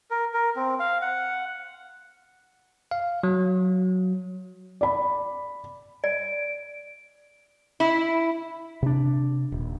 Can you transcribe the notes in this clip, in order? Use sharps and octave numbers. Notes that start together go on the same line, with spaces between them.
A#4
A#4
C4
F5
F#5
F5
F#3
D5 B5
D5 D7
E4
C3 D4
D#1